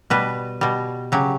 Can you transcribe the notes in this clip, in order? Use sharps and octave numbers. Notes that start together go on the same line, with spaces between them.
B2 G3 B4
B2 G3
C#3 F#3 G4